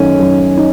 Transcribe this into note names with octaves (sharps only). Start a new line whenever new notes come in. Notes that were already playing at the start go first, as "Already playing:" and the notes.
Already playing: F#2 D#3 A3 C#4 D#4
F#2
D#4